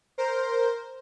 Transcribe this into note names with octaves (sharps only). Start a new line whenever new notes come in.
A#4 C5